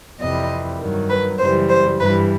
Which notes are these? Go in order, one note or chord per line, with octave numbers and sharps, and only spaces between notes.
F2 C3 E3 G3 D#5
G2 D#3 F#3
B4
F#2 C#3 E3 G3 C5
C5
G2 E3 G3 B4